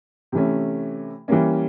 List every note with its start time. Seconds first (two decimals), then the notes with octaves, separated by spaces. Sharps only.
0.32 C3 E3 A3 C#4
1.28 E3 G3 A#3 C#4